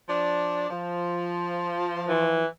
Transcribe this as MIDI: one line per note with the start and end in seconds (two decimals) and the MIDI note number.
0.09 0.68 53
0.09 0.68 62
0.70 2.45 53
2.09 2.46 52